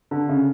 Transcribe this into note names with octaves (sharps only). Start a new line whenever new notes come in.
D3
C#3